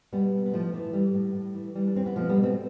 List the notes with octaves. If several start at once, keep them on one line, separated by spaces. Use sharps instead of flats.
B2 G3 B3
B2
B3
A2 F3 A3
E3
A2 G3
A2
A2
E3
E3 G3
D4
E3 C4
B3
B2 F3 A3
G3 B3
B2
A3 C4